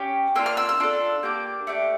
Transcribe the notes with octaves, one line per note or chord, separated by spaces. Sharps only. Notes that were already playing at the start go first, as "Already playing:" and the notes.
Already playing: C#4 G4
A#3 D4 F4 E6
F6
E6
E6
D4 F4 A4
A#3 D4 G4 D6
A3 D4 G4